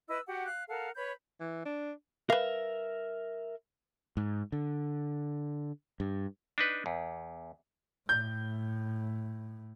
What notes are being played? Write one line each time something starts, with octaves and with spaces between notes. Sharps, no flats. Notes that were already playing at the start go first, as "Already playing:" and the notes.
E4 B4 D#5 E6
F#4 G4 F#5
F5 F#6
A4 A#4 F5 F#5
B4 C#5 B5 G6
E3
D4
A#4 B4 E5 F5
G#2
D3
G2
D4 D#4 B4
E2
A2 G6